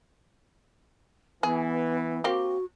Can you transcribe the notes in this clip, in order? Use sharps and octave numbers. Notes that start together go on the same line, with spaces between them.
E3 B3 G#4
A#3 C4 F#4 G4